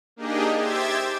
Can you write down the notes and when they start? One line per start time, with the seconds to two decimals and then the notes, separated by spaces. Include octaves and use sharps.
0.16 A#3 D4 D#4 G4 G#4 D#5
0.57 G4 C5 E5 G5 G#6 A6